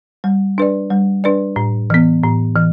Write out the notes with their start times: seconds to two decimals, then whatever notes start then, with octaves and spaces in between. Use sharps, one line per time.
0.24 G3
0.58 D4 B4 D5
0.90 G3
1.24 D4 B4 D5
1.56 A2
1.90 E3 B3
2.23 A2
2.56 E3